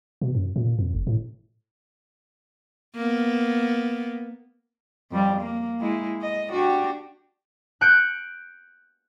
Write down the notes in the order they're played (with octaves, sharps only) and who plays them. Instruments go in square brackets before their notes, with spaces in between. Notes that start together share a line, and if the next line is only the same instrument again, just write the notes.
[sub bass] B2
F#2
A#2
F2
F#1
A2
[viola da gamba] A#3 B3
F2 G3
A#3
G#3 E4
D#5
D4 F#4 G4
[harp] F#6 G6 C#7 D7